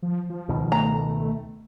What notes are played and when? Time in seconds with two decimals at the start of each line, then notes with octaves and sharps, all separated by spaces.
0.02 F3
0.30 F3
0.48 C#2 B2 D#3
0.72 A3 A#5